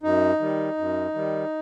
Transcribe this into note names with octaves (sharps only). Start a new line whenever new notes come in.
F#2 D#4
D#3 G3
F#2
D#3 G3